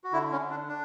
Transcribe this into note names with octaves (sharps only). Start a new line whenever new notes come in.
F#4
D3 E4
C#4
D3
D4
D4